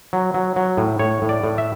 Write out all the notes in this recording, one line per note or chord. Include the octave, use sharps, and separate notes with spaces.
F#3
F#3
F#3
A2
A2 C#5
A2
D5
A2
E5